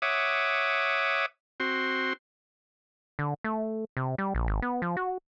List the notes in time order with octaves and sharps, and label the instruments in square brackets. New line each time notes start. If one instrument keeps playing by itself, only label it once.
[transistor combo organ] C#5 E5 F#5 D6 D#6
C4 F#4 C6
[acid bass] D3
A3
C3
G3
A#1
G#1
B3
F3
F#4